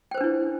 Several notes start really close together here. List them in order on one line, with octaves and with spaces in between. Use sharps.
G5 C5 B4 D4 E4